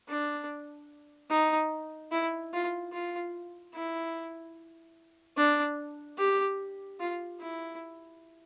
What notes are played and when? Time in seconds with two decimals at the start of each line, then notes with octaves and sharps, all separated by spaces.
0.08 D4
1.30 D#4
2.11 E4
2.53 F4
2.92 F4
3.74 E4
5.37 D4
6.18 G4
6.99 F4
7.40 E4